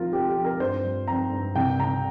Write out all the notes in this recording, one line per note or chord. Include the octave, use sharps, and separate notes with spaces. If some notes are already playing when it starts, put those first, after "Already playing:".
Already playing: F2 F3 F4 A#4
C4 G4
G4
F2
A#4
G2 C5
G3
C4 A#5
G2
C2 G5
C3 A#5